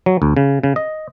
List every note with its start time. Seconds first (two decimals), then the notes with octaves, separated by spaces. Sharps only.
0.06 F#3
0.22 D2
0.37 C#3
0.63 C#3
0.76 D#5